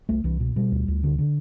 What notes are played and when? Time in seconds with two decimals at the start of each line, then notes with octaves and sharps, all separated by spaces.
0.09 C2 A3
0.24 C2 E3
0.40 B2
0.56 B2 G3
0.72 D2
0.88 D2
1.04 D3
1.19 D3